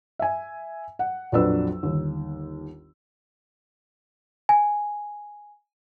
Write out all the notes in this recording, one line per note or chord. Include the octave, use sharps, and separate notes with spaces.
E5 G#5
F#5
A#1 F2 F#3 D4 B4 E6
G1 D#2
G#5